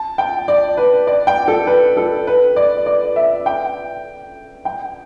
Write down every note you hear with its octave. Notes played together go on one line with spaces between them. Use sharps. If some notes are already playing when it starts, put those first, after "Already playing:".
Already playing: A5
G5
D5
B4
D5
G5
A4
B4
A4
B4
D5
D5
E5
G5
G5